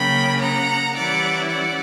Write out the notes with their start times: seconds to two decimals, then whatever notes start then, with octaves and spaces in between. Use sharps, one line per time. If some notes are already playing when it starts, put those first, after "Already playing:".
Already playing: C#3 F#3 A#3 G5 B5
0.41 F#5 A#5
0.95 E3 G3 C#4 E4 D5 F#5
1.49 D5 F#5